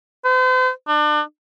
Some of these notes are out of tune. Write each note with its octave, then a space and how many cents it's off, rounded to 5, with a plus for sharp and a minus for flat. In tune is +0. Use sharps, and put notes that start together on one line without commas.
C5 -40
D4 +35